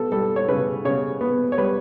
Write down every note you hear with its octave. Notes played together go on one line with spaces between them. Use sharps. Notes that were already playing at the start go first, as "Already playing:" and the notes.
Already playing: B3 A4
G3 A4
C#5
C#3 B4
C#3 C#5
B3
C#5
G3 B4